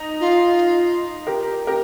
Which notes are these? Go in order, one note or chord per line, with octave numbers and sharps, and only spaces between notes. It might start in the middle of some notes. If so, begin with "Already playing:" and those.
Already playing: D#4
F4
G4 A#4
G4 A#4